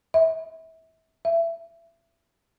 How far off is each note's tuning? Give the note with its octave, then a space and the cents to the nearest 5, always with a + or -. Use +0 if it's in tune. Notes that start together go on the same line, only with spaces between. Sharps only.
E5 -30
E5 +25